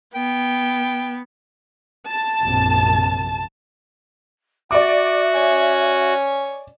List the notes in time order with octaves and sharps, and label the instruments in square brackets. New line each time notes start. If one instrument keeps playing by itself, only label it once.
[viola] B3 [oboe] G5
[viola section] A5
[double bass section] A#1 F#2 C3
[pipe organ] F#4 [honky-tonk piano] D5 D6 [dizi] E5
[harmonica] C#5 G#5